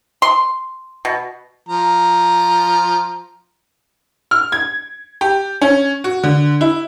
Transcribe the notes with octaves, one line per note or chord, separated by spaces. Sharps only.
C6
B2
F3 A#5
F6
G#6
G4
C#4
F#4
D3
E4